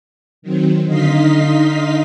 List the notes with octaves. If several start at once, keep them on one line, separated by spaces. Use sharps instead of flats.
D#3 F#3 C4
D3 D#4 D#5 F5 C6 B6